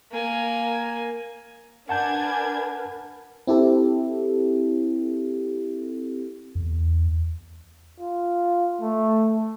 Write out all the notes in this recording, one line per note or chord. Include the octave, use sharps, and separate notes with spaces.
A#3 G#5
D4 A#4 B4 F#5 G#5 A5 G6 G#6
C4 E4 G4 A4
E2
F4
A3